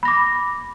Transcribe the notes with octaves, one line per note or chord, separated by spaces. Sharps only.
B5 D6 A#6